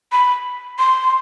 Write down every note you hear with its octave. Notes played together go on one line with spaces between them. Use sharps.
B5
C6